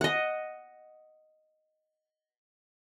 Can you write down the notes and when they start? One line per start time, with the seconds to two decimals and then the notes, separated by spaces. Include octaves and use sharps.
0.01 D#5 F#5